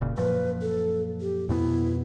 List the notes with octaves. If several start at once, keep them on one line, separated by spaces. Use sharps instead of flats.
E1 A#2 C#3
F#2 A#2 F3 B4
A4
G4
F2 B2 B3 E4